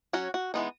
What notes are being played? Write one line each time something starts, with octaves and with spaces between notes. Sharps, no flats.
F#3 C#4 F#4
F#4
E3 G#3 B3 D#4